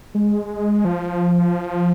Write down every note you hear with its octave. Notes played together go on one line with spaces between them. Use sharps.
G#3
F3